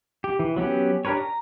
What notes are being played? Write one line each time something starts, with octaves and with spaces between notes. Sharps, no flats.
G4
E3
F#3 B3 C#4 G4
D4 G4 A#4 B4 C#5
A#5